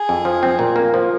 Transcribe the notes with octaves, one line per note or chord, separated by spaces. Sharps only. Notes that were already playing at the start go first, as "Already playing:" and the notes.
Already playing: G#4
F2
F3
C4
A#2
A#3
F3